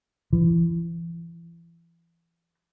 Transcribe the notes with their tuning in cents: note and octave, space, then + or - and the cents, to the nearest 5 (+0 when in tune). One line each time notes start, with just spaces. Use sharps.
E3 +35